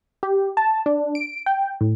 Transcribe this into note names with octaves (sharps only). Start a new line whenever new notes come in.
G4
A5
D4
D7
G5
A2